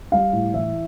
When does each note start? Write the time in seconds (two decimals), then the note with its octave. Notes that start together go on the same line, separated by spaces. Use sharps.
0.12 G3 F5
0.33 A2
0.54 E3 E5